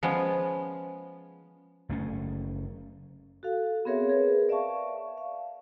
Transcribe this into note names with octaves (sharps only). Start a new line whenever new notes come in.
F3 G#3 B3 C#4
F#1 A3 C#4
F#4 A4 F5
B3 C4 G#4 A#4 C#5 E5
G#4 A#4 B4
D5 E5 F5 A5 C#6
F5